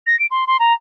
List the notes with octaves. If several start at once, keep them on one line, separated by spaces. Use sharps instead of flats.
A#6
D7
C6
C6
A#5